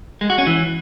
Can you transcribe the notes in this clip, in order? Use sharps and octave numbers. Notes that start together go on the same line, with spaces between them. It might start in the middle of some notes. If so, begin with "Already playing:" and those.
G#3
F#4
C#4
E3